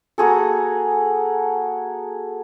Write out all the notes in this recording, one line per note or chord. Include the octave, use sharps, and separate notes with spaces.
A#3 F#4 G#4 A4